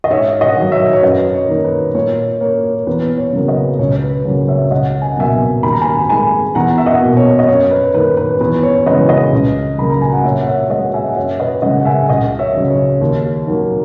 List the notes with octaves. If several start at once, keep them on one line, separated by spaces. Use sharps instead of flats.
D#5
G#2 C#5 E5
D#5 F#5
D#3
F#3
C#5 E5
C#5
F#2 B4 D#5
C#5
D#3 A#3
B4
A#2 C#5
A#3 C#5
E2 B4
C#5
C#3 F#3 A#3
B4 D#5
C#2 C#5
C#5
B4
C#3 F#3 A#3 C#5
C#5 E5
C#2 D#5 F#5
G#5
F#5
B2 F#3 A#3 E5 G#5
D#2 B5
A#5
G#5 B5
D#3 G#3 G#5 B5
E2 F#5 A#5
E5
D#5 F#5
B2 A#3
C#5
D#5
F#2 C#5
B4
D#3 A#3 B4
B4
E2 B4
C#5
C#3 E3 G#3 B4 D#5
B4 D#5
C#2
C#3 F#3 A#3 B5
A#5
G#5
F#5
A#2 C#5 E5
F#5
C#5 E5
G#3 D#5 F#5
E5 G#5
F#5
F#2 C#5 E5
B4 D#5
C#3 G#3 D#5 F#5
F#5
E5 G#5
C#2 D#5 F#5
C#5 E5
C#3 F#3
C#5
D#2
D#3 F#3 A#3